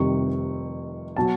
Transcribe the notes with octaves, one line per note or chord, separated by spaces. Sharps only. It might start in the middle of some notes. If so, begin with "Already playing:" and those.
Already playing: F1 F2 C3 D#3 G3 C#6
B2 F#3 A5